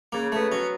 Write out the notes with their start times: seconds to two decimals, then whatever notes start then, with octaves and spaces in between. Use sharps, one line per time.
0.12 C#3 A#3
0.32 A3 B3
0.52 F#3 C#4